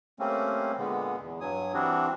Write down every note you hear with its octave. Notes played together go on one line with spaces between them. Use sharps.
G3 A3 A#3 C4 C#4
A#2 D3 G#3 B3
E2
G2 F#3 G#5 D#6
E3 G3 C4 D4 F#4